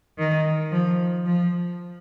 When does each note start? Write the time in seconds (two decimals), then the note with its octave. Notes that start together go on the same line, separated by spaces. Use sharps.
0.18 D#3
0.72 F3
1.26 F3